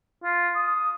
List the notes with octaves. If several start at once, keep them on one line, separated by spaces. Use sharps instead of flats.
F4
D#6